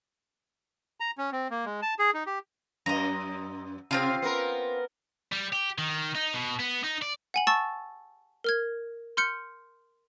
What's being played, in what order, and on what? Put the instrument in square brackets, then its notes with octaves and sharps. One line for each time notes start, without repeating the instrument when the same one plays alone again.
[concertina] A#5
C#4
C4
A#3
G#3
A5
G#4
D#4
G4
[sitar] F#2 [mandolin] D#5 A#5
[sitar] C3 [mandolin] C4 F4 F5
[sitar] B3 A#4
[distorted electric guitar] G3
G4
D#3
D#4
B2
B3
D#4
D5
[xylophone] F#5 G#5 F#7
A5 C#6 E6 A6
A#4 F6 G#6
C6 F6 G6 C#7